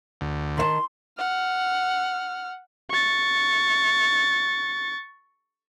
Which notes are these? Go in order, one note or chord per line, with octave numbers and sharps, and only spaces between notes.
D2
D#3 E5 A5 C6
F#5 F6
C#6 A6